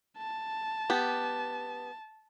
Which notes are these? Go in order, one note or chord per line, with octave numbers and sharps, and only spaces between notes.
A5
B3 G4